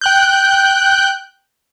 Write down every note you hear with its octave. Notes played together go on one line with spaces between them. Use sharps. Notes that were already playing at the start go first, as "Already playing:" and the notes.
G5 F#6 G6